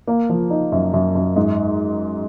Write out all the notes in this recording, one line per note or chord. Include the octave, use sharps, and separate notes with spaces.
A#3
F3
D#4
F#2
F#2
F#2
G#2